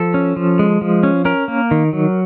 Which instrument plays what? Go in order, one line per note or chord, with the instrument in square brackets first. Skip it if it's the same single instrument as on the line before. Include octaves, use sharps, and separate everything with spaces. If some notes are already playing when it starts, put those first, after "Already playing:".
Already playing: [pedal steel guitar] F3 A4
C#4
F3
G#3
F3
C#4
C#4 A#4
A#3
D#3
F#3